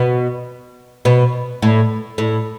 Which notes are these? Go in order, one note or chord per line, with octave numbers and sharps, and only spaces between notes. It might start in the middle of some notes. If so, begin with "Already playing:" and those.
Already playing: B2
B2
A2
A2